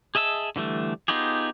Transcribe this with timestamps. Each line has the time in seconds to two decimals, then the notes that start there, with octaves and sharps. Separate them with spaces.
0.15 G#4 D#5 E5 A5 E6
0.56 D3 E3 G3 A3
1.08 B3 D#4 F4 G4 G#4